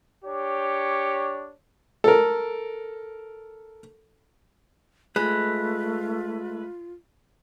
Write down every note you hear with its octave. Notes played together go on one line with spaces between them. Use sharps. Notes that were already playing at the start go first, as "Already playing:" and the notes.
D4 G4 C#5
A4 A#4
G#3 A3 F4 B4